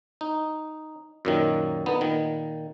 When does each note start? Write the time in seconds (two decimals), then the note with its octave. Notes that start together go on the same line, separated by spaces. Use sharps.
0.21 D#4
1.25 F#2 A#2 D#3
1.86 D3 B3 D#4
2.01 A#2 D#3